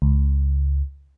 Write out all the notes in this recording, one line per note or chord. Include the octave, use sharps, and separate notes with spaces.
C#2